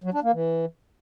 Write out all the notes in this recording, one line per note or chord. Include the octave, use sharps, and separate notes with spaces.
F#3
D4
A#3
E3